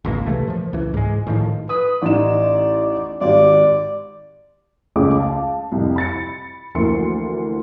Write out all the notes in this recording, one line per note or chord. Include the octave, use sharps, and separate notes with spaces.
G#1 C#2 C#3 A#3
C3 E3 A3
A#2 F3
C#2 E3
G#2 G#3
A2 D#3 F3
B4 D#6
A1 D#4 D5 E7
G#1 G4 D5
C#2 C#3 A3 C#4 F4 D6
F5 A5
C2 F2
B5 A6 C#7
D2 E3 F3 A#3 C6 C#7